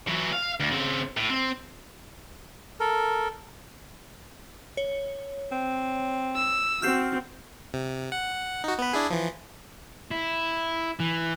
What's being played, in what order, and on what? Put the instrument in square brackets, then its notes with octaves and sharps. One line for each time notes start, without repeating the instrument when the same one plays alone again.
[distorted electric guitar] E3 F#3
F5
D2
C#3 C4
A2
C4
[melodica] A4 A#4
[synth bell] C#5
[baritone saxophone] C4
[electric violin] E6
[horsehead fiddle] C4 F#4 [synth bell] F6 G6 C7
[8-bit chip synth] C3
F#5
D#4 F#4
B3 B4
D4 E4 G#4
E3 F3
[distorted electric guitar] E4
E3